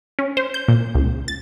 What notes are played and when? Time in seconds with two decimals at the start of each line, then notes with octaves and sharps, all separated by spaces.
0.19 C#4
0.37 C5
0.54 G6
0.68 A#2
0.95 C#2
1.28 A6